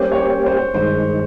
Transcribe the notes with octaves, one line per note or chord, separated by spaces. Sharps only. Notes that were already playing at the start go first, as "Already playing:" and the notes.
Already playing: G3 A#3 C#4 G4 C5
C#5
C5
C5
G2 D#3 G#3 C5